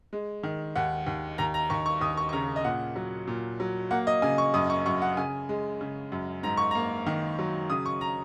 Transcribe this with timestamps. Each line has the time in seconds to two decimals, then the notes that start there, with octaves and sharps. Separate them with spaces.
0.13 G#3
0.43 D#3
0.75 D#2 F#5
1.06 D#2
1.38 D#2 A#5
1.54 A#5
1.70 D#2 C#6
1.86 C#6
2.01 D#2 D#6
2.17 C#6
2.29 C#6
2.33 C#3 A#5
2.56 D#5
2.64 A#2 F#5
2.96 F#3
3.27 A#2
3.60 F#3
3.91 A#3 F#5
4.07 D#5
4.22 C#3 G#5
4.38 C#6
4.54 F#2 D#6
4.70 C#6
4.86 F#2 C#6
5.02 F#5
5.17 C#3 G#5
5.49 G#3
5.81 C#3
6.12 F#2
6.43 G#2 A#5
6.57 C#6
6.71 A#3 A#5
7.07 D#3
7.39 F#3
7.70 C#3 D#6
7.86 C#6
8.01 A#5